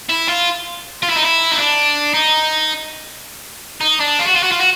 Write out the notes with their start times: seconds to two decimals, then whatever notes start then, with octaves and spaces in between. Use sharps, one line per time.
0.09 E4
0.28 F4
1.03 F4
1.10 E4
1.16 D#4
1.23 E4
1.52 D#4
1.58 D4
2.14 D#4
3.81 D#4
4.00 D4
4.19 F4
4.26 F#4
4.35 F4
4.43 F#4
4.52 F4
4.61 F#4